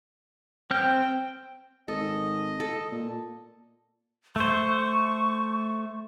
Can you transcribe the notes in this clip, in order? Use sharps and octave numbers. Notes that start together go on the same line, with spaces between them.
C4 G5 F6 G6
G#1 A4 D#5
A4
A#2
A3 C5 C#6